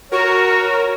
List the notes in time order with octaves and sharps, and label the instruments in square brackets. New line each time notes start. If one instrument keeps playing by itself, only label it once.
[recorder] F#4 [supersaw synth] A#4 [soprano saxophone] C#5